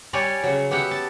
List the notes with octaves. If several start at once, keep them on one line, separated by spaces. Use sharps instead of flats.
G3 G4 C#5 D5 G#5
C#3 F#3
B3 G4 E5 F#5
A5